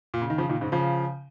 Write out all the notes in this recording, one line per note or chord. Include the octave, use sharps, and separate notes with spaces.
A#2
C#3
D#3
C#3 F3
A#2 D#3
G#2 C#3
C#3 F3